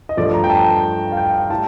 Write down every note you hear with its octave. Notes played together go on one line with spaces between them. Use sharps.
D#5
G2 F3 A3 D5
A#5
G5
A5
F5
G5
F5
A2 G3 A5